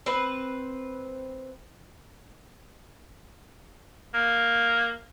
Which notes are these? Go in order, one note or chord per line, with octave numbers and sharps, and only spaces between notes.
C4 B4
A#3